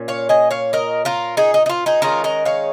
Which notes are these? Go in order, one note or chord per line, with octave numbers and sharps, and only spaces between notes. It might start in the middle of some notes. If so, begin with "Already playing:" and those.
Already playing: A#2 C#4
C#5 F5
D#5 G#5
C#5 F5
A#4 D#5
F4 A#4
D#4 G#4
D#4
D#4
F4
D#4 G#4
D#3 G#3 C#4 F4 A#4
A#4 D#5
C#5 F5